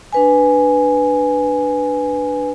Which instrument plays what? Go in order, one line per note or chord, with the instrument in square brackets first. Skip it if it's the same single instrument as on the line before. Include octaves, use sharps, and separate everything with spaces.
[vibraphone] D4 B4 G#5